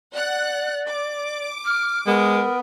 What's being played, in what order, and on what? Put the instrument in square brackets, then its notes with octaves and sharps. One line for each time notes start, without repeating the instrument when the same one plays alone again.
[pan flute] D5 [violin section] F#5 F#6
[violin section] D6
[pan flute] F6
[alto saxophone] G#3 [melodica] B3 [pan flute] A#4